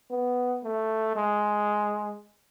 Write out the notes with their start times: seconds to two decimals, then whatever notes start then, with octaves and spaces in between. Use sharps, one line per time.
0.10 B3
0.64 A3
1.16 G#3